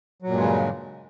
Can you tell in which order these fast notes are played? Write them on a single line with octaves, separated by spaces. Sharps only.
F#3 A#2 G2 G#3 C#3